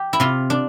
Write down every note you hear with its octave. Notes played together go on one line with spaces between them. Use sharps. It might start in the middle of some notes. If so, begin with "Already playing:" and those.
Already playing: G4
E4
C3 F4
D4